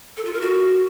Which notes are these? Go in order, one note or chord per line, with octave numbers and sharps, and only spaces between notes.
A4
F4
A#4
F#4